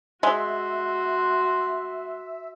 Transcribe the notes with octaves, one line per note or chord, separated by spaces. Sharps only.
G#3 F#4 E5 C6